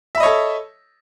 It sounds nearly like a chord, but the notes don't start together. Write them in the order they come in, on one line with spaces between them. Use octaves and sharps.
E5 B5 D#5 C#5 A4